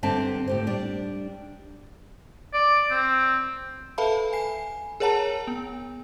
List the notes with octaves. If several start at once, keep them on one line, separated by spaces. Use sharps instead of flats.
G2 D3 C4 E5 A5
A2 G4 C5
G3 D4
D5
C4
A4 B4 E5 F5 A5 B5
G#5 C7
G#4 A#4 C#5 F#5 A5 A#5
B3